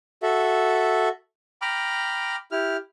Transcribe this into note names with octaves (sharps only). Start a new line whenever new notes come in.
F#4 A4 E5
G5 A#5 B5 D6 F6
E4 G4 F6